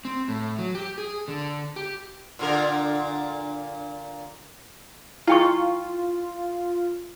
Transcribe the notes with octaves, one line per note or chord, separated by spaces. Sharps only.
C4
A2
F#3
G4
G#4
D3
G4
A#2 D3 A#4
E4 F4 G5 C#6